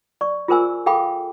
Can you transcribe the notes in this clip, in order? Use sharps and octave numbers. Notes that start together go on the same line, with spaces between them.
D5 C#6
F4 G#4 A#4 C5 G#5 E6
G#4 A4 F5 G5 B5 D6